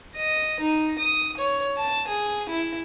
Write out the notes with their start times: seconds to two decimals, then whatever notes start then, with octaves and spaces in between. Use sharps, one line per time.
0.16 D#5
0.60 D#4
0.98 D#6
1.37 C#5
1.77 A5
2.08 G#4
2.49 E4